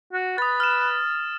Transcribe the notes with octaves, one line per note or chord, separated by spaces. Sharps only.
F#4
B4 D#6 A6
F6 E7